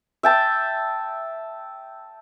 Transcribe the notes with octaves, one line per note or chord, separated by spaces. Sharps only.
E5 G5 A5